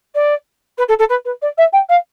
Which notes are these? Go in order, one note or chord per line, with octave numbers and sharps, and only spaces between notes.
D5
B4
A4
A4
B4
B4
D5
E5
G5
F5